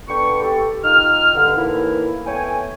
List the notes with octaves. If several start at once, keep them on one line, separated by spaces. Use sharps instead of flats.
D3 B3 B4 G5 C#6
G4 A4
D#3 D#4 F4 F6
G2 D3
A2 E3 A#3 D#4 E4
A3 B3 C#5 G5 G#5